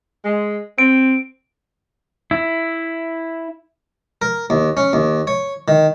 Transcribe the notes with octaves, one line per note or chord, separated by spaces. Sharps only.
G#3
C4 D7
E4
A#4
D#2
C#4
D#2
C#5
D#3